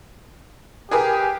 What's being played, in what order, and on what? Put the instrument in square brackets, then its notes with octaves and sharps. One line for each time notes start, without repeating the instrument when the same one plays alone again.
[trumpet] G4 [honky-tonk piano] G#4 A#4 B4